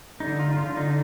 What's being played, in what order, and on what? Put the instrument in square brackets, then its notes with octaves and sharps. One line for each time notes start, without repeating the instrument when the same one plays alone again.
[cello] D3 [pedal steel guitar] D#4
[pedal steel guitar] F4
[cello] D3 [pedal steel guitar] F4
[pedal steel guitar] D#4